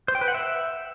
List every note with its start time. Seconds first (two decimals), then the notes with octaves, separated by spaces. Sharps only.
0.08 C5
0.15 G5
0.21 B4
0.28 F#5
0.34 E5